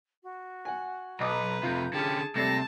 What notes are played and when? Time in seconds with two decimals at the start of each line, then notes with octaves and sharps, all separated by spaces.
0.23 F#4
0.65 F#5 G#5
1.20 B1 B4 D#5 A#5 D6 D#6
1.63 F2 C3 F4 G6
1.93 D3 C#4 G4 G#4 A5
2.36 D#2 C3 G3 A3 A5 A#6